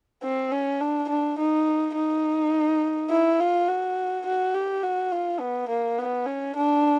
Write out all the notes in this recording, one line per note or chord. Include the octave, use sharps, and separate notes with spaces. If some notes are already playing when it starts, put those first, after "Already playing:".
C4
C#4
D4
D4
D#4
D#4
E4
F4
F#4
F#4
G4
F#4
F4
B3
A#3
B3
C#4
D4